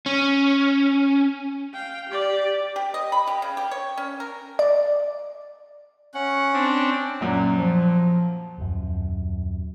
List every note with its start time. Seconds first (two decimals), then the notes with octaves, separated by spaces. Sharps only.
0.06 C#4
1.73 F5 G5
2.09 G4 D5
2.76 G4
2.94 D#5
3.12 B5
3.27 G4
3.42 C#3
3.57 G4
3.71 C#5
3.98 C#4
4.20 A#4
4.59 D5
6.14 C#4 F#5
6.53 C4 D4
7.21 F#2 A#2
7.57 F3
8.58 D#1 F#2